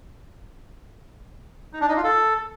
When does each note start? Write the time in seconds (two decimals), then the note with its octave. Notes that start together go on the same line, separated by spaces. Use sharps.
1.73 D#4
1.81 D4
1.89 D#4
1.96 F4
2.04 A4